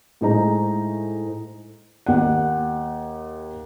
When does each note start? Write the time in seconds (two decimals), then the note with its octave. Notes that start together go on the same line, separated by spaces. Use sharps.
0.21 A2 G#3 D#4 C5 A#5
2.06 D#2 F#5